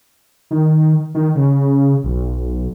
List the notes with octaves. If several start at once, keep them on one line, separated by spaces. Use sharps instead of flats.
D#3
D#3
C#3
B1